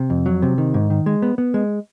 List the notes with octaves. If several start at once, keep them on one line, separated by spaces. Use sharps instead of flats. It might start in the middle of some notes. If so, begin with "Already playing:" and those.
Already playing: C3
F2
F#3
C3
D#3
G#2
D#3
G#3
B3
B3
G#3